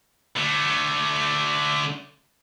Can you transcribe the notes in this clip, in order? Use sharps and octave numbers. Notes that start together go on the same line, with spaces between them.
D3 A3